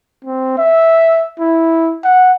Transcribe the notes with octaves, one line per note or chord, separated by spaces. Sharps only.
C4
E5
E4
F#5